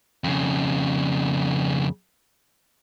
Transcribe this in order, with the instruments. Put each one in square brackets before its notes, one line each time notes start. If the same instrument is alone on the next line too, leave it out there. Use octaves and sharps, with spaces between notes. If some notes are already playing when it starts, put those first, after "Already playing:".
[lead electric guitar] F2 C#3